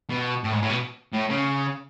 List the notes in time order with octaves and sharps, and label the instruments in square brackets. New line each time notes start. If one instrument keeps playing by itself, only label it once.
[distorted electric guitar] B2
A2
G#2
A2
B2
A2
C#3